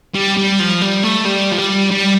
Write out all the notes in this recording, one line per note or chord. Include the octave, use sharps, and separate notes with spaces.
G3
G3
F3
G3
A3
G3
F3
G3
G3